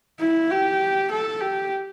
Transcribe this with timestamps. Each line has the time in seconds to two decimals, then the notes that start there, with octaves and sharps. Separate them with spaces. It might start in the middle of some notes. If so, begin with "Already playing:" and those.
0.20 E4
0.51 G4
1.11 A4
1.41 G4